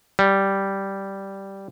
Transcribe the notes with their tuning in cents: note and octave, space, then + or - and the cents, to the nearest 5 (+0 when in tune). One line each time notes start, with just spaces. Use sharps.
G3 -5